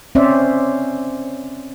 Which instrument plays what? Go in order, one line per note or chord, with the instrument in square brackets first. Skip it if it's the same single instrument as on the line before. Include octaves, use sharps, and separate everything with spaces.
[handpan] C4 C#4 C5 D5 E5